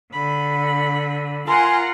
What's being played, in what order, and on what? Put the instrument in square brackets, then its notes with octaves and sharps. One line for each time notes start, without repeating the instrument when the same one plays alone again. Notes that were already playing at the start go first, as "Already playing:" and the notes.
[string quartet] D3 [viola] B5
[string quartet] F4 [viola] A#4 F#5 [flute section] G#5 C6